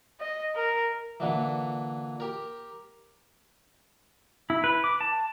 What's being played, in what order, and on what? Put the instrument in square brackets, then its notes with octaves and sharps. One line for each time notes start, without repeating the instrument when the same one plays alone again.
[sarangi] D#5
A#4
[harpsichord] A#2 D3 E3
G4 A#4
[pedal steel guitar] E4
B4
D6
A5